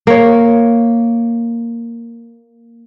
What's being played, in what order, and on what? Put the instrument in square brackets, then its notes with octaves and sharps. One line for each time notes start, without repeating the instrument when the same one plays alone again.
[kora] A#3 C#5